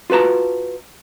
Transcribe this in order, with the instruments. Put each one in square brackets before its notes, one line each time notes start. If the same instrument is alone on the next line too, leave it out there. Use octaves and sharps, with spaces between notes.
[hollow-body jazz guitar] F4 F#4 B4 A5 A#5